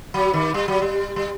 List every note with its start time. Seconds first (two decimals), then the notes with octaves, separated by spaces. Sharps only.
0.14 F#3
0.33 D#3
0.54 G3
0.68 F#3
0.82 G3
1.16 G3